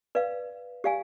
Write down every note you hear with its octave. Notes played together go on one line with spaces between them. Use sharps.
B4 D5 F5
G4 D5 F5 G#5